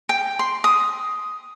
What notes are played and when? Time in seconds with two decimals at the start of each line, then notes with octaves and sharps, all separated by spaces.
0.09 G5
0.39 C6
0.64 D#6